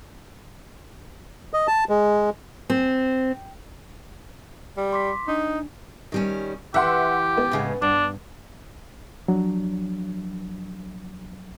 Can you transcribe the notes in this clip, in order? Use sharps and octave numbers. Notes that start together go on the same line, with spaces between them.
D#5
A5
G#3
C4
G3
C6 D6 B6
D4 D#4
D#3 G3 C#4
E3 G4 E5 F#5 C6
B3
A2 C#3 G#3
G2 D4
F3 F#3 D4